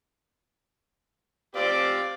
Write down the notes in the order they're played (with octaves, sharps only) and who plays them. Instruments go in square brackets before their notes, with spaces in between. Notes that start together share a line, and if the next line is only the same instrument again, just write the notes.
[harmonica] C4 F4 G4 [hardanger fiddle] D5